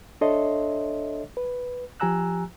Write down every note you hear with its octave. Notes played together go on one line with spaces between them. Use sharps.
D4 A4 C#5 D#5 E5 C6
B4
F3 G4 G#5 A#5 E6 F#6